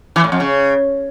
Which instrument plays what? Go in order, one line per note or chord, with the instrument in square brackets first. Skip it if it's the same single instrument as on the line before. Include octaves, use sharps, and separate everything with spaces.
[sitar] E3
A2
F2
C#3